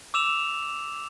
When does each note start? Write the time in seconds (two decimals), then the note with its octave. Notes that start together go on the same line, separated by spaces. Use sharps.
0.14 D6 E6 E7 F7